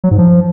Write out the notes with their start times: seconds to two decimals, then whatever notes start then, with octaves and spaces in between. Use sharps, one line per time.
0.04 F#3
0.11 G#2
0.18 F3